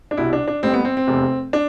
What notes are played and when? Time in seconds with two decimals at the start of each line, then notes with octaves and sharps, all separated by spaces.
0.11 D4
0.17 C2 B2 G3 E4
0.33 D4
0.48 D4
0.63 A1 A2 G3 C4
0.74 B3
0.85 C4
0.97 C4
1.08 F1 E2 C3
1.53 D4